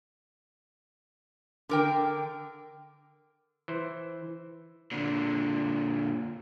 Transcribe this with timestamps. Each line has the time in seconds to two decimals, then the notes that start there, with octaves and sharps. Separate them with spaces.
1.69 D3 A#4 G5
3.68 E3 C5
4.92 A#2 D3